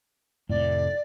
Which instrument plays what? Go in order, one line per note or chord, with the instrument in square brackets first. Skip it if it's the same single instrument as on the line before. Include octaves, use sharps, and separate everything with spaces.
[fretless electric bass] F1 A2 [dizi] D5